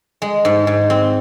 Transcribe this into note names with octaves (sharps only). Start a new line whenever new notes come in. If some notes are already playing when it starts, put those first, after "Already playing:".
G#3
G#2
G#2
C4